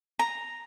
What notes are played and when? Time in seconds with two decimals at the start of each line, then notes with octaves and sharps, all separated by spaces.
0.19 A#5